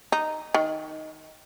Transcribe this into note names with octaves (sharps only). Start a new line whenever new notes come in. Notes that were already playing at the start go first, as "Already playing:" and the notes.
D#4
D#3